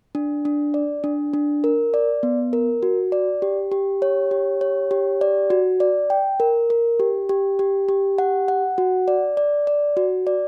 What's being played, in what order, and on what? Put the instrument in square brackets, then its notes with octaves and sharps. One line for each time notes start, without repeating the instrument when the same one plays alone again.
[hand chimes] D4
D4
D5
D4
D4
A#4
D5
B3
A#4
F#4
D5
G4
G4
C#5
G4
C#5
G4
D5
F#4
D5
G5
A#4
A#4
G4
G4
G4
G4
F#5
F#5
F#4
D5
D5
D5
F#4
D5